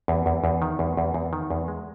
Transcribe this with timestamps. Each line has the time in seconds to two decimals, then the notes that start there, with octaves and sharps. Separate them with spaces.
0.08 E2
0.26 E2
0.44 E2
0.62 D#3
0.79 E2
0.97 E2
1.14 E2
1.33 D#3
1.51 E2
1.68 G#3